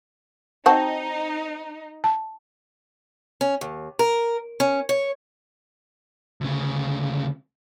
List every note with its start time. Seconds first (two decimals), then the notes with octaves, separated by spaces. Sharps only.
0.66 C4 D#4 F#4 A5
2.04 A5
3.41 C#4
3.61 D#2
3.99 A#4
4.60 C#4
4.89 C#5
6.41 D2 C#3